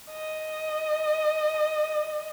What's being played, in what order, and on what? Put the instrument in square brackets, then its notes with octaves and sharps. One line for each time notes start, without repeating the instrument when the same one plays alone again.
[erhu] D#5